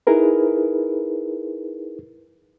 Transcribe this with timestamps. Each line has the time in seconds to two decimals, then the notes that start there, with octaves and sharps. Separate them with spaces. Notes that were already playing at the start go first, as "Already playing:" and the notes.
0.07 D#4 E4 G#4 A#4 B4